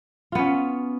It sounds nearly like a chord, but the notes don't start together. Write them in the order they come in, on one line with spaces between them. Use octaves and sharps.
F4 B3 C#4